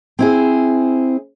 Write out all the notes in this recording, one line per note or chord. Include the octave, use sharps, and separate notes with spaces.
C4 E4 G#4